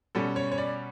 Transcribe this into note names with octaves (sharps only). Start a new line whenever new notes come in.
B2 G3 C#4 A4
C#5
C#5
D5